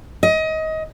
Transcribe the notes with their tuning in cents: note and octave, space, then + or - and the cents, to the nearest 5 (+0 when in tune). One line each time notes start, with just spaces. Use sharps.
D#5 +25